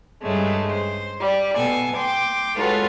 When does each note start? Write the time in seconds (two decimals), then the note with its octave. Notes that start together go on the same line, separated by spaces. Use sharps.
0.21 G2 C#3 G#3 A3
0.70 C5
1.19 G3
1.55 B2 A4 G#5
1.95 G5 C6 D6
2.55 G#3 F4 F#4 A4 B4 C#5